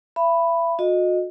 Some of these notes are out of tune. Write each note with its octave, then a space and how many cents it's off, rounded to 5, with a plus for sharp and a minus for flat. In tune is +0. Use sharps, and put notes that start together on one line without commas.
E5 +35 B5 +0
F#4 -40 A4 -10 D#5 -10